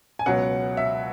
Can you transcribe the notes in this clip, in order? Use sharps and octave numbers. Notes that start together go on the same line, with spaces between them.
G#5
C#2 B2 F#3 F#5
E5